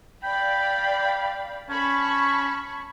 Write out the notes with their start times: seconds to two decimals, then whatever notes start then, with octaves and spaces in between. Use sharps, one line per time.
0.23 D5 F5 G5 B5
1.69 C#4 A5 B5 C#6